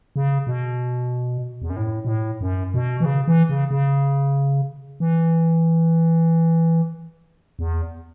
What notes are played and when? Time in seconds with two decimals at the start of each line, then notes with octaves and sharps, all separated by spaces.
0.16 C#3
0.47 B2
1.62 E2
1.70 F#2
1.76 A2
2.05 B2
2.09 A2
2.41 F#2
2.74 B2
3.00 E3
3.05 C#3
3.28 E3
3.49 C#3
3.71 C#3
5.00 E3
7.59 E2